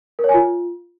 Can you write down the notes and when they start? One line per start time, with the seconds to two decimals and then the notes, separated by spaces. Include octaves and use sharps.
0.19 A#4
0.24 C#5
0.29 G#5
0.34 F4